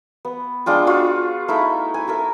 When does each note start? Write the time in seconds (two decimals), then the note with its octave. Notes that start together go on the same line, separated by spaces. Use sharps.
0.25 B3
0.66 G#3 D4 F4 G5
0.87 F4 F#4 G#4 C#5
1.48 A3 D#4 E4 E5
1.94 G#5
2.08 A4 A#4 E5